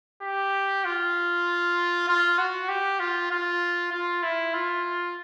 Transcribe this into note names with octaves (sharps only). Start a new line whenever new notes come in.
G4
F4
F4
F#4
G4
F4
F4
F4
E4
F4